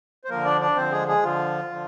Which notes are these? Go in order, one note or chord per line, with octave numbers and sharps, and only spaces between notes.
C5
D3 F3 A#3 A#4
D4 D5
D4 D5
D3 F3 C4 C5
G#3 G#4
G#3 G#4
D3 F3 F4
D3 F3